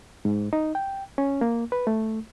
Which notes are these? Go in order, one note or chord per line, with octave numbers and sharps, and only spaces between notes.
G#2
D#4
G5
C#4
A#3
B4
A3